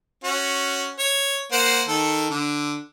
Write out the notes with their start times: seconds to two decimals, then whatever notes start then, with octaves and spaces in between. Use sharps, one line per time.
0.24 C#4 F#4
0.99 C#5
1.52 A#3 C5 F#5
1.88 D#3 A4
2.30 D3